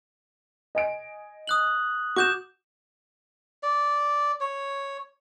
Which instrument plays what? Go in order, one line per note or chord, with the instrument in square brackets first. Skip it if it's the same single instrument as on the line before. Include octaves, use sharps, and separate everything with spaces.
[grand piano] D#5 G#5 D7
[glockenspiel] D#6 F#6 F#7
[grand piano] F#4 [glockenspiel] D6 G6 E7
[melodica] D5
C#5